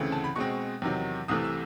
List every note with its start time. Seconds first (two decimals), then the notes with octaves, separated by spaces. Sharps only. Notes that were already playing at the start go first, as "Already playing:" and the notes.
Already playing: D2 C#3 E3 A3 C4
0.12 A5
0.24 B5
0.36 B2 G#3 C4 C#6
0.82 E2 C3 D#3 F#3
1.28 C2 C3 E3 A3 D#6
1.44 E6